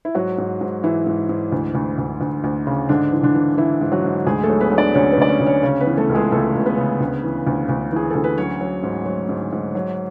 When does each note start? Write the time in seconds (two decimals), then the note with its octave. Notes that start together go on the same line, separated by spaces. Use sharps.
0.05 E4
0.15 G#2 F#3 F#4
0.38 G#2
0.61 G#2
0.83 G#2 E3 E4
1.07 G#2
1.29 G#2
1.52 D2
1.75 D2
1.98 D2
2.21 D2
2.44 D2
2.67 C#3
2.89 G#2 D3 D4
3.12 E3
3.23 D3 D4
3.35 E3
3.58 E3 E4
3.81 G#2
3.92 F#3 F#4
4.04 G#2
4.27 D2 G#3 G#4
4.43 A3 A4
4.49 F#3
4.61 B3 B4
4.72 F#3
4.77 D4 D5
4.94 D2 C#4 C#5
5.12 B3 B4
5.18 D2 D5
5.29 C#4 C#5
5.40 D2
5.46 C#4 C#5
5.63 C#3 C#4 C#5
5.80 B3 B4
5.87 E3
5.97 A3 A4
6.09 C#2
6.15 G#3 G#4
6.32 C#2 A3 A4
6.55 C#2
6.66 B3 B4
6.78 C#3
7.01 D2
7.23 E3
7.47 D2
7.69 D2
7.92 E3 G#4
8.10 D2 A4
8.24 B4
8.38 F#3 C#4 C#5
8.61 F#3
8.83 G#2
9.06 F#3
9.29 G#2
9.52 G#2
9.75 F#3